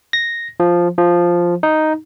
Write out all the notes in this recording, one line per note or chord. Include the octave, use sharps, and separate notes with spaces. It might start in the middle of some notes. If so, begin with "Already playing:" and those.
A#6
F3
F3
D#4